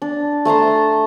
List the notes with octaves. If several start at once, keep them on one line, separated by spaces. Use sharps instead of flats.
D4
A3 A5 A#5 C6